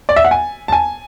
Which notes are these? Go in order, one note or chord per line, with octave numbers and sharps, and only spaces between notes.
D5
E5
F#5
G#5
A5
G#5